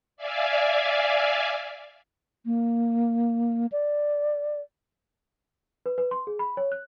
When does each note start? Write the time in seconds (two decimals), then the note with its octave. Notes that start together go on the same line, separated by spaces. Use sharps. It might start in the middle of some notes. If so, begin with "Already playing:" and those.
0.17 D5 E5 F5 G#5
2.46 A#3
3.72 D5
5.86 B4
5.98 B4
6.11 C6
6.27 G#4
6.39 B5
6.57 C#5
6.72 F#6